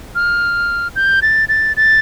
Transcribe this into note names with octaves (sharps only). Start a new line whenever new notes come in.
F6
G6
A6
A6
A6